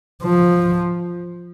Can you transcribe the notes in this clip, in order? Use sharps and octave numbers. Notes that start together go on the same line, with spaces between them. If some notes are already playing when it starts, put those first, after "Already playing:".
F3